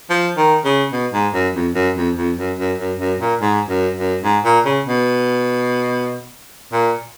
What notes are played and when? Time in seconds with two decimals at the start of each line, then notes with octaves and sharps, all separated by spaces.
0.10 F3
0.37 D#3
0.65 C#3
0.92 B2
1.13 G#2
1.34 F#2
1.55 F2
1.75 F#2
1.96 F2
2.17 F2
2.38 F#2
2.59 F#2
2.79 F#2
2.99 F#2
3.20 A#2
3.41 G#2
3.69 F#2
3.97 F#2
4.24 G#2
4.45 A#2
4.66 C#3
4.86 B2
6.73 A#2